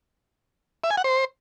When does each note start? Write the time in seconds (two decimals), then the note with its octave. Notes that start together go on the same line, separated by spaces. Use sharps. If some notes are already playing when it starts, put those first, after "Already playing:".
0.84 E5
0.91 G#5
0.97 F#5
1.04 C5